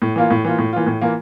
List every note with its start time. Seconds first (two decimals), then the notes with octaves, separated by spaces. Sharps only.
0.02 A2
0.16 E3 A#3 F4
0.30 A2
0.45 E3 A#3 F4
0.58 A2
0.73 E3 A#3 F4
0.86 A2
1.01 E3 A#3 F4